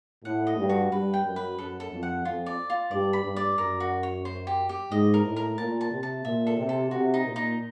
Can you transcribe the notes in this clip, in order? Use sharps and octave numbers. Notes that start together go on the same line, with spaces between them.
A2 F#5
D#5
G2
F#4
G2 B4
G5
F#2
B4
F#2 A4
A4
F2
F#5
F2 F4
D5
F4
G2 D5
B5
G2
D5
F#2 A#4
F#4
C#5
C5
G4
G4
G#2 D#5
A#4
A2
A#4
A#2 A5
A5
C3
A5
A#2 E5
A4
C3
A4
C3 F#4
D#4
A#2
D#4